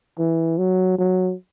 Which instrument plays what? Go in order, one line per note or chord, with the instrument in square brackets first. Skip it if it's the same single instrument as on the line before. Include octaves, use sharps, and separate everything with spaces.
[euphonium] E3
F#3
F#3